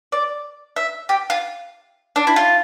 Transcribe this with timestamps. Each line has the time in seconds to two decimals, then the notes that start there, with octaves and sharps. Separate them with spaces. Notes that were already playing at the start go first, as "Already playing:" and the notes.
0.12 D5
0.76 E5
1.09 G4
1.30 F4
2.16 D4
2.27 E4
2.36 F4